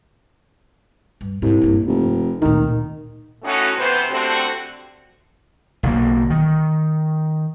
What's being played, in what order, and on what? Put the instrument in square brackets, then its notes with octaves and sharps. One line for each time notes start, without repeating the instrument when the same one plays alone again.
[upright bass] G2
[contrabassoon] C2 [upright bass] G#2
[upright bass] G2 A#3
[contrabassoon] F1
[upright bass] D2 A#2 [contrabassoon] D#3
[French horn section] A2 A3 C#4 D#4 F#4
C3 E3 B3 C5
D3 A3 C4 F#4 G4 C5
[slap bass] B1 D3 A#3
D#3